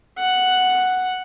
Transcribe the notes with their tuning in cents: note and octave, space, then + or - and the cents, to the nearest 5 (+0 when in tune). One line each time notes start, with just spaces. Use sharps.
F#5 +0